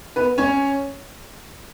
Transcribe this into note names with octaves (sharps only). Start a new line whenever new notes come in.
B3 B4
C#4 C#5